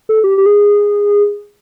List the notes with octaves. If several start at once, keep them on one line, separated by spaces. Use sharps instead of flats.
A4
G4
G4
G#4